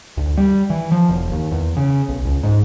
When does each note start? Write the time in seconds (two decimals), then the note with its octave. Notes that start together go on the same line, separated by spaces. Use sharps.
0.17 D2
0.38 G3
0.70 E3
0.92 F3
1.09 E1
1.31 D#2
1.52 E2
1.77 C#3
2.09 B1
2.25 C#2
2.43 G#2